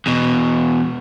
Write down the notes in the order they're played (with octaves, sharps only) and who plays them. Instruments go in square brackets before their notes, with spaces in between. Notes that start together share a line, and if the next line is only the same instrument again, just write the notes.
[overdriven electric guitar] E2 B2